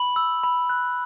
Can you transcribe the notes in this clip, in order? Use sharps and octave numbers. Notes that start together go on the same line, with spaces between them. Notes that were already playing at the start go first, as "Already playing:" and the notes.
Already playing: B5 F#7
E6
B5
F#6